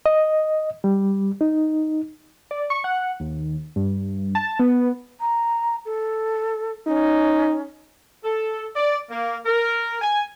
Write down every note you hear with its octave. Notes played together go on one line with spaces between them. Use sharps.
D#5
G3
D#4
D5
C#6
F#5
D#2
G2
A5
B3
A#5
A4
C#4 D#4
A4
D5
A#3
A#4
G#5